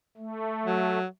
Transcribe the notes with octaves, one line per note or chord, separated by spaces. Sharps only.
A3
F#3